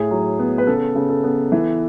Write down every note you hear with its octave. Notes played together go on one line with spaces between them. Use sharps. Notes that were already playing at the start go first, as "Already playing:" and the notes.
Already playing: A2 G#4
F#3
B3
B4
C#3 A4
C#3
A4
B3
E3